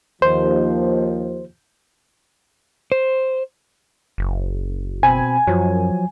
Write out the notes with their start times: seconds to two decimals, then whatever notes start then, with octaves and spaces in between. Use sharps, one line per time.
0.22 D#2 F3 C5
2.92 C5
4.18 F#1
5.03 B2 C4 G#5 B5
5.47 F#2 F3 F#3